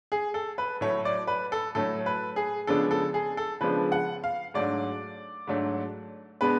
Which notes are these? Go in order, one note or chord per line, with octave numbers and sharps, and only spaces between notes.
G#4
A4
B4
A2 F#3 A3 C#5
D5
B4
A4
A2 F#3 A3 A4
B4
G#4
C#3 F3 G#3 B3 D4 A4
A4
G#4
A4
C#3 F3 G#3 B3 D4 B4
F#5
F5
G#2 F#3 A3 D4 D5
G#2 F#3 A3 D4
B2 G#3 B3 D4 B4